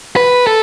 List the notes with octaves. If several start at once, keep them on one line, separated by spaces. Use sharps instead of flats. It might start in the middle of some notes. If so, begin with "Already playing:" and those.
B4
A4